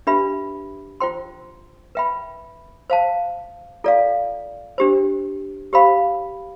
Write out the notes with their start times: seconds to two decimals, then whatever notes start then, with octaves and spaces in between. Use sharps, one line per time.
0.07 D4 G4 B4 E5 B5
1.00 F4 C5 G5 C6
1.95 B4 E5 G5 B5
2.90 C5 F5 A5
3.84 F4 A4 D5 F5
4.78 D4 G4 C5
5.73 G4 C5 F5 B5